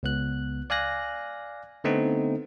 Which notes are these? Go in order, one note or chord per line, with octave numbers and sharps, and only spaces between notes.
C#2 B3 F#6
D5 F5 G#5 F#6 A#6
D3 A3 B3 C4 D#4